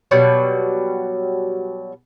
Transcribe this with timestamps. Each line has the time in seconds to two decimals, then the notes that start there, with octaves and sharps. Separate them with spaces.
0.11 B2 F#3 G3